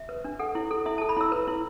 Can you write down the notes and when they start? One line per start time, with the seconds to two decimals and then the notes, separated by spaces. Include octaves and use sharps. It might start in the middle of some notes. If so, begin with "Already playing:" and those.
Already playing: E5
0.09 B4
0.24 D4
0.39 A4 F#5
0.55 E4
0.71 A4
0.86 E4 E5
0.98 A4 A5
1.09 B5
1.16 E4 E6
1.32 B4
1.47 E4